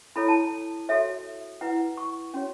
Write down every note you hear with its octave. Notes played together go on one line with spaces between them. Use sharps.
E4 A4 C#5 B5
A5
F#4 A4 C#5 E5
E4 B4 F#5
C#6
C#4 F#4 C#5